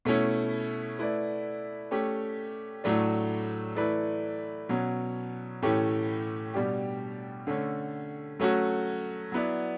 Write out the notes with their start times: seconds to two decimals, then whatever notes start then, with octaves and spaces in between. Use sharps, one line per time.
0.05 B2 A3 C#4 E4
0.99 A3 E4 B4 D5
1.91 A3 C#4 G4
2.84 A2 F#3 A3 D4
3.76 E3 A3 E4 B4 D5
4.69 B2 F#3 C#4
5.62 A2 E3 A3 C#4 G4
6.54 B2 G3 D4 G4
7.47 D3 A3 C#4
8.40 F#3 A3 C#4 F#4
9.32 F#3 B3 E4 B4 D5